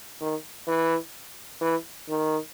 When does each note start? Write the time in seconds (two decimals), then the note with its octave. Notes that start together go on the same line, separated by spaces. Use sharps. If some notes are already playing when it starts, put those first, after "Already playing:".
0.21 D#3
0.67 E3
1.61 E3
2.09 D#3